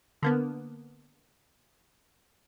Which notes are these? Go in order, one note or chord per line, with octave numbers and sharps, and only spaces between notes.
D3 A#3 B3